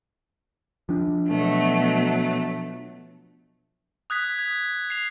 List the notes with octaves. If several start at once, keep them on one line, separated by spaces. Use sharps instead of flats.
F3 D4
B2 F#3 A3
D#6 F#6 G#6 B6
G#6
C7 F7